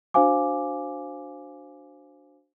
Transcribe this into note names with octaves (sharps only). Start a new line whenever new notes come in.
D4 F#4 C5 F5 G#5 D6